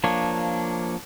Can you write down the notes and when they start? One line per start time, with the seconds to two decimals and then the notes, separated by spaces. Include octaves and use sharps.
0.04 F3 A#3 D4 C#5